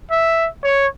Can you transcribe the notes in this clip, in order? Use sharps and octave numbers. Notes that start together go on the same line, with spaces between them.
E5
C#5